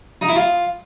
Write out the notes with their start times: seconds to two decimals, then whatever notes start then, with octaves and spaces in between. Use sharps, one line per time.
0.21 D#4
0.28 E4
0.35 F4